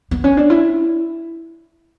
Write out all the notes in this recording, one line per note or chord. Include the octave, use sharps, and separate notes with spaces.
B3
C#4
D4
E4